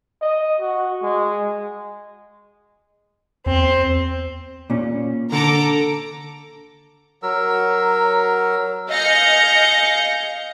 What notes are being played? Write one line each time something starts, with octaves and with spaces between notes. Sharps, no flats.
D#5
F#4
G#3
E2 C4
A#2 C#4
D3 A4 A#5 D6
F#3 A#4 E6
D#5 F5 G#5 G6 A#6 C#7